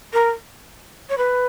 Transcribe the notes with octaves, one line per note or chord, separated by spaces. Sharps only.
A#4
C#5
B4